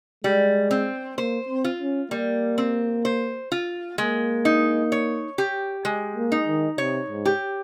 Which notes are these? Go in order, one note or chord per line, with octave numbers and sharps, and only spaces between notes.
G3 G#3
C4
A#3 C5
C4
F4
C#4
G3 A#3
C4
C5
F4
G#3 A#3
D#4
C#5
G4
G#3
A#3
D#4
D#3
C3 C#5
G#2
G4